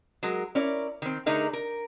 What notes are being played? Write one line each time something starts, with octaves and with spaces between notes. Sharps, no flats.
F#3 G#3 A#4
C#4 E4 A#4 D5
D#3 C4
D3 A3 D#4 G#4 A#4
A#4